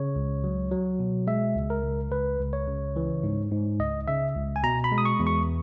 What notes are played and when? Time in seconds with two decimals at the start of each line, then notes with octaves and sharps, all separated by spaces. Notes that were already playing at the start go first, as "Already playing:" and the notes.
Already playing: C#3 C#5
0.16 C#2
0.44 F#3
0.71 F#3
1.00 B2
1.27 G#3 E5
1.56 C#2
1.70 A#4
1.83 C#2
2.11 C#2 B4
2.40 C#2
2.53 C#5
2.67 C#3
2.96 E3
3.23 G#2
3.51 G#2
3.80 C#2 D#5
4.08 C#3 E5
4.36 C#2
4.56 G#5
4.63 B2 A#5
4.84 B5
4.92 G#3
4.98 D#6
5.05 C#6
5.20 E2
5.27 C#6